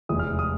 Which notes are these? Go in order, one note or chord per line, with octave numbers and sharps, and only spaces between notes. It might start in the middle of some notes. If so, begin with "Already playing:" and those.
F1 E2 C3 E3 G#3 D#6
F6
D#6